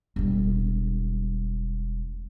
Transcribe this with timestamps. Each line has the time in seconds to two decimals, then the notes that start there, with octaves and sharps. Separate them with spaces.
0.16 E1 G3